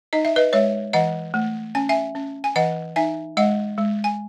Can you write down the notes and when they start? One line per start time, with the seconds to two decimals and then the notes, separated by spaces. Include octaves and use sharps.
0.13 D#4 D#5
0.25 E5
0.36 B4 D#5
0.53 G#3 C#5 E5
0.93 E3 D#5 F#5
1.34 A3
1.75 C#4 G#5
1.89 E5 G#5
2.15 C#4
2.44 G#5
2.56 E3 D#5 F#5
2.96 D#4 E5 G#5
3.37 G#3 D#5 F#5
3.78 G#3
4.04 G#5